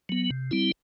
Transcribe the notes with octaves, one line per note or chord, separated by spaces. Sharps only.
F#3 B3
C3
G3 C4 E4